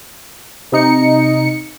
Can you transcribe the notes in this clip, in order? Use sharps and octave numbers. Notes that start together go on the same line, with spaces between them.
C3 D#4 C#7